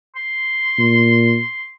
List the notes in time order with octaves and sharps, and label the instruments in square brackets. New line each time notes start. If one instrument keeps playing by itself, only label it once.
[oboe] C6
[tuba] A#2